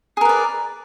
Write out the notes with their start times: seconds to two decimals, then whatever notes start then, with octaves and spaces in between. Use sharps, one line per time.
0.17 G#4
0.21 A#4
0.25 B4
0.29 D5